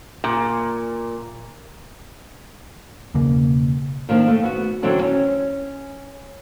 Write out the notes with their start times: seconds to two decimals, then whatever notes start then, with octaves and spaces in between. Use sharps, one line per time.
0.24 A#2
3.14 E1 C#3 A#3
4.09 D#3 F3 A#3 D4
4.28 A3
4.43 B3 F#4
4.83 D3 E3 F#3 C4 D4 A4
5.03 C#4